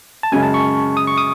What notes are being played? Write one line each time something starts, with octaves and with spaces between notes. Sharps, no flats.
A5
F#2 C#3 G#3 G#5
A5
C#6
D#6
C#6
D#6